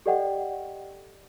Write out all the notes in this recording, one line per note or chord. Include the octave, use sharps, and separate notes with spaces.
G4 A4 D5 D#5 F#5 G5